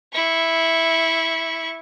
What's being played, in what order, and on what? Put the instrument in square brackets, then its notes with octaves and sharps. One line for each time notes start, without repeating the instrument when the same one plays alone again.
[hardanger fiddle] E4 C#6